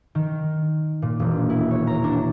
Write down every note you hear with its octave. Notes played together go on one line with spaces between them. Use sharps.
D#3
A#2
E1
E4
C#5
A#5
D4